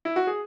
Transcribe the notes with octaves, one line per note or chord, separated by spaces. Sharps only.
E4
F#4
G#4